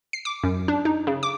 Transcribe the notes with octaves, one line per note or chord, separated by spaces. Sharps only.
C7
D6
F#2
D4
D#4
C#3
D6